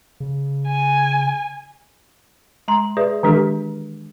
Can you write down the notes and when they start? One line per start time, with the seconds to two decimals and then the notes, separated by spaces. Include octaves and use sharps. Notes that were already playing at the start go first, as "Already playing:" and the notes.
0.20 C#3
0.68 G#5
2.68 G#3 A#5 C6
2.97 G#4 B4 D5 E5
3.23 D#3 E3 G#3 D4 G4 A4